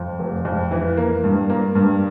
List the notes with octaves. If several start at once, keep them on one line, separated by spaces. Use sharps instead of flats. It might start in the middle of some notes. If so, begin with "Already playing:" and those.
Already playing: F2
F1
F2
E3
A#3
G2
A#3
G2